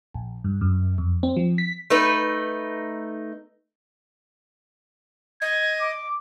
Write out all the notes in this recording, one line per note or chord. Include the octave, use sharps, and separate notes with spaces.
A#1
G2
F#2
F2
C4
F3
B6
A3 D#4 B4
D#5 G#6
D6